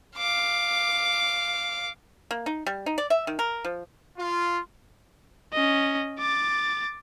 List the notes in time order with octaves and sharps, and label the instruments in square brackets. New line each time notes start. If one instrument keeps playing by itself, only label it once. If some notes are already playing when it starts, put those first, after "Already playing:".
[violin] F5 D6
[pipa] A#3
D#4
G3
D#4
D5
E5
D#3
A#4
F3
[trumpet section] F4
[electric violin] C#4 D#5
D6 A6